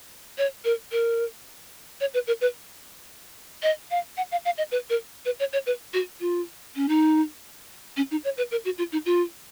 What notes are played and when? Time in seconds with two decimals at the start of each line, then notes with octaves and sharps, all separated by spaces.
0.38 C#5
0.65 A#4
0.92 A#4
2.01 C#5
2.14 B4
2.27 A#4
2.41 B4
3.63 D#5
3.91 F5
4.17 F#5
4.32 F5
4.45 F5
4.58 D#5
4.72 B4
4.90 A#4
5.25 B4
5.40 C#5
5.53 C#5
5.66 B4
5.94 F#4
6.21 F4
6.76 C#4
6.89 D#4
7.97 C#4
8.11 D#4
8.24 C#5
8.37 B4
8.51 A#4
8.65 F#4
8.78 F4
8.92 D#4
9.06 F4